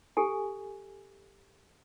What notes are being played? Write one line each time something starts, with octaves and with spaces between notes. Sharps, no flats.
G4 A4 G#5